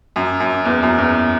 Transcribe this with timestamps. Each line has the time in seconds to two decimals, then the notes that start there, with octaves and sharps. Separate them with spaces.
0.16 F#2
0.40 F#2
0.65 E2
0.83 F#2
0.98 E2